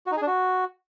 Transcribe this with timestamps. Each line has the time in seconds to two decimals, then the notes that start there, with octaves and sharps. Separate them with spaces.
0.07 F#4
0.12 D#4
0.17 G#4
0.22 D4
0.27 F#4